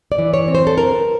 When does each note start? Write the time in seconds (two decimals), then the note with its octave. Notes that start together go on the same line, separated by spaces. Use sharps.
0.12 D5
0.18 E3
0.34 C#5
0.48 C4
0.55 C5
0.67 A4
0.77 E3 A#4